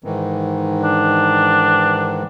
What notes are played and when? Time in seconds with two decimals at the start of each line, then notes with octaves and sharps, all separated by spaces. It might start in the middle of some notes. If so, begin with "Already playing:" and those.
0.04 G#2 D#3 E3
0.82 D4